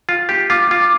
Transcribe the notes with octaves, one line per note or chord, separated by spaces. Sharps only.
F4
G4
F4 D6
F4